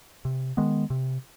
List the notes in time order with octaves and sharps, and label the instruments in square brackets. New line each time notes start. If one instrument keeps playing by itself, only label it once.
[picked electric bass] C3
D#3 G#3 B3
C3